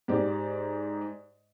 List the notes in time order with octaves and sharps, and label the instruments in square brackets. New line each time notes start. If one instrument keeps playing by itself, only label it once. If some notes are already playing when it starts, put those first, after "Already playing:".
[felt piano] G#2 G4 D5